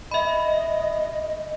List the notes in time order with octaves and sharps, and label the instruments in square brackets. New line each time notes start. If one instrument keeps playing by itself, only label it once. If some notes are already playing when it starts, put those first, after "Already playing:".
[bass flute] D#5 [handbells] E5 B5